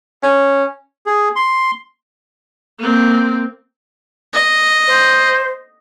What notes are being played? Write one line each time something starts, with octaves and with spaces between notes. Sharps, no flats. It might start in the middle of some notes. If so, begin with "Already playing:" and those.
C#4
G#4
C6
A#3 C4
D#5
C5